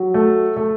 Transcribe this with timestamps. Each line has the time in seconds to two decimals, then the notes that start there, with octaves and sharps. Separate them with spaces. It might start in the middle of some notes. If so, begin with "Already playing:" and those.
Already playing: F#3
0.14 A3
0.57 A3